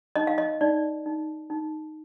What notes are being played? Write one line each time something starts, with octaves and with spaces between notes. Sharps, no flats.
D#4 D#5
F5
D#5
D#4 D5
D#4
D#4